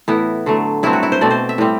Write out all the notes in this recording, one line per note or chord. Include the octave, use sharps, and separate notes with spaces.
A2 E3 B3 E4
D3 F#3 A3
G2 F#3 A3 C4 E4
F#4
E4
C5
B2 A3 C4 D5
C5
E5
A2 G3 C4